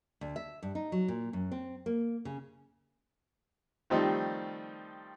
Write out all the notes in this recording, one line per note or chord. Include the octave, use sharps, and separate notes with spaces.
D2
E5
G2
D#4
F#3
A#2
F#2
C4
A#3
C#3
D#3 F3 G3 A3 C4 D#4